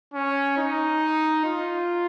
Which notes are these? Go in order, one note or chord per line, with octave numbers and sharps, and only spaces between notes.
C#4
D#4
F4